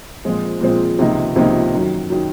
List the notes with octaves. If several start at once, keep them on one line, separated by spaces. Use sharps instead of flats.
A#2 F3 G#3 C4 F4
A#2 F3 G#3 C4 F4
C#2 C3 F3 A#3 D#4
C#2 C3 F3 A#3 D#4
F#2 D#3 F#3
D#3 F#3